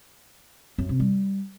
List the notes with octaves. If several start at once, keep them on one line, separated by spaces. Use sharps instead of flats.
F#2
C3
G3